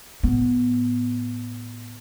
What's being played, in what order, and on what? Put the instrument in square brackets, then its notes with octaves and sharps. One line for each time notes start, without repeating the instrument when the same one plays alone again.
[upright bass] A2 B3